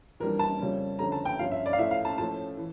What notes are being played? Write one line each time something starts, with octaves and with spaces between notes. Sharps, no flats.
F2 E3 G3 D4 A#4
A5
F2 C#3 G3 C#4
F2 D3 F3 A3 C#4 A#5
A5
G5
G2 F3 C#4 F5
E5
D5
F5
A2 F3 A3 C#4 E5
F5
A5
A2 F3 A3 C#4 A5
E3